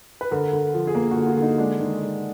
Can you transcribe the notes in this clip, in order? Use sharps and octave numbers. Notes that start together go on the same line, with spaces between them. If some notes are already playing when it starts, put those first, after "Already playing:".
B4
D3 A#4
D3
F3
G#4
A#3 A#4
F#4
D3
F4
D3 D#4
G#3 D4
D#3
G#3